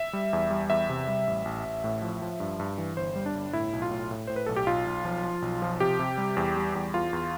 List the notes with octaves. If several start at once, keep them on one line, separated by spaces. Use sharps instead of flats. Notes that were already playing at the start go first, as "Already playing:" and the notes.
Already playing: E5
G3
E2
G3
E2 E5
C3
G3
A1
A1
A1
A2
F3
F3
G2
G2
E3
G1 C5
G3
D4
G1
A2 E4
B1
F4
A2
A2
A2 C5
B4
B1 A4
G4
B1 F4
B1
F3
F3
B1
F3
C3 G4
C3
G3
E2
G3
E2
E2 F4
E2